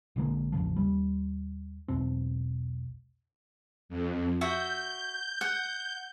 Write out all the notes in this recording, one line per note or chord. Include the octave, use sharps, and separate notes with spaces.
A#1 D3 G#3 A#3
A1 E2 C#3 F3
D#2 G3
E1 B1 B2 C4
F2
F#4 E5 G6
F#5